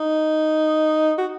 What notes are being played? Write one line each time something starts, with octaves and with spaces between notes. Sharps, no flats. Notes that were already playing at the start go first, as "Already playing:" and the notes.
Already playing: D#4
F#4